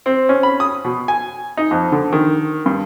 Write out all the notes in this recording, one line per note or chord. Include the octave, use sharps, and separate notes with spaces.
C4
C#4
B5
D#6
B2
G#5
D#4
F2
D3
D#3
G2